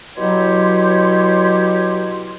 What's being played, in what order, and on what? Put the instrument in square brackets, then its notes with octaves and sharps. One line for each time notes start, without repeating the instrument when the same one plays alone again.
[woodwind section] B2 F#3 E4 G4 C#5 C6